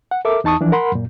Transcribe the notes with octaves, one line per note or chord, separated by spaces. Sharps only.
F#5
A4 A#4 E5 D6
E2 D#4 A5 C#6 D#6
E3 F3 D4
A#4 F#5 B5 C6
F#2 A#2